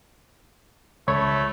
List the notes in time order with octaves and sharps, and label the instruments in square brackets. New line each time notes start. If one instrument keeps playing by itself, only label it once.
[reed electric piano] C#2 C#5 B5 [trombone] A3